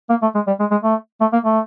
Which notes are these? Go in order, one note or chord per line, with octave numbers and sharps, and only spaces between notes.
A#3
A3
G#3
G3
G#3
G#3
A3
A3
A#3
A3